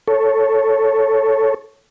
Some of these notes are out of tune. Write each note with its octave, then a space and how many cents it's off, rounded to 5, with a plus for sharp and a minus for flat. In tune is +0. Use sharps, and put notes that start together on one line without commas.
A4 +0 C#5 +0